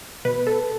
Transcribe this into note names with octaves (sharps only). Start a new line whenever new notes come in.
B2 B4
A4